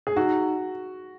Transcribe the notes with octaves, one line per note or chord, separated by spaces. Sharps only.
G#4
D#4 F#4